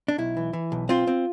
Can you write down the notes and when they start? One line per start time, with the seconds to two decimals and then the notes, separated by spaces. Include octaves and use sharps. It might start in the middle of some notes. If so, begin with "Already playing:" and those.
0.08 D4
0.18 B1 E4
0.37 E3
0.53 E3
0.72 B1
0.89 C4 F4
1.07 C4